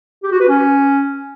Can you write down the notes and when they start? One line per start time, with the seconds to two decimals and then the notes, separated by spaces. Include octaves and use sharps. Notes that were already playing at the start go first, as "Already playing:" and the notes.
0.23 G4
0.32 F#4
0.40 B4
0.48 C#4